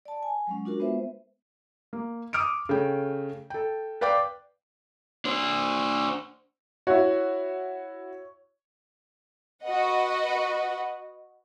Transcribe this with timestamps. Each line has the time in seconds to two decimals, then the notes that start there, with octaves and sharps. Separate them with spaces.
0.05 D5 A5
0.23 G#5
0.47 F#3 G#3 C#4
0.65 D4 F4 F#4 A#4
0.79 G#3 B3 B4 C5 E5
1.93 A#3
2.33 D6 D#6 F6 C#7 D7
2.69 C#3 A3 G5
3.50 A4 G5
4.01 B4 D5 F5 G5 D6
5.25 D4 C5
6.87 E4 F#4 C#5
9.65 F#4 B4 D#5 F#5